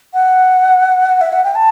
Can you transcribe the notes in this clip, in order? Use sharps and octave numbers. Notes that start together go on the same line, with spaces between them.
F#5
E5
F#5
G5
A5